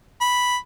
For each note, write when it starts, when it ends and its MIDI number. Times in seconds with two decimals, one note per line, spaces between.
0.21 0.57 83